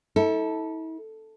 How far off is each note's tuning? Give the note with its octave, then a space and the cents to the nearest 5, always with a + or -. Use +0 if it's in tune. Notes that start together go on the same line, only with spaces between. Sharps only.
E4 -40 A4 +0